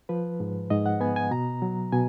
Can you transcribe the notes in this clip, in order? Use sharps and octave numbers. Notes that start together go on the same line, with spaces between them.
F3 B4
G#2
G#2 D#5
F#5
B3 G#5
G#5
B2 A#5
F#3
B2 G#5